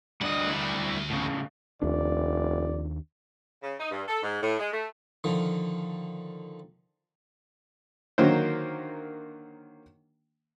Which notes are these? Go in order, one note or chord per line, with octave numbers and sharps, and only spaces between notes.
D2 G3 D4 D#5 F#5
G3 E4
A2 C#3
F1 D#2 D4 D5
C#3
D#4
G2
A4
G#2
A2
G#3
A3
D3 D#3 F3
D3 D#3 F#3 A#3 C5